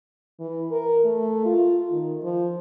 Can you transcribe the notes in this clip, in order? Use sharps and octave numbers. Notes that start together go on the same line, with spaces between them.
E3
A#4
A3
F4
D#3
F3